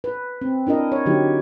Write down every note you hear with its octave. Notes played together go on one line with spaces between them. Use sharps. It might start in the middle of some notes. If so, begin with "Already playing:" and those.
B4
C4
D4 E4 A#4 D#5
C#5
D3 F#3 D#4 G4